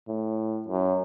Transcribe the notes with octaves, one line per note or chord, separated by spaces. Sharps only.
A2
F#2